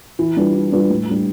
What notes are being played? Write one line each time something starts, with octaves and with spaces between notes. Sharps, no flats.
E3
G3 D4 F4 B4
E3
G3 D4 F4 B4
A2
G3 D4